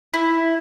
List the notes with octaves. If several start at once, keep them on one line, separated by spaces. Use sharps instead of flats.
E4